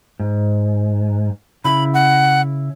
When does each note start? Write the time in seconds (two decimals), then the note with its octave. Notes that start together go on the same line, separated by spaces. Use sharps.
0.20 G#2
1.65 C#3 E4 B5
1.94 F#5